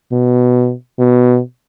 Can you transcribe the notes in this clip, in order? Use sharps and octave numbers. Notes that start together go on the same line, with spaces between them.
B2
B2